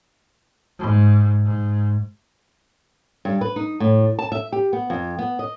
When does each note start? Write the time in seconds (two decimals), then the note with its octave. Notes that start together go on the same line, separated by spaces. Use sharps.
0.79 G#2
1.46 G#2
3.25 G2
3.41 B4
3.56 D#4
3.80 A2
4.19 A5
4.32 E5
4.52 G4
4.73 B3
4.90 F2
5.19 B3
5.39 D#5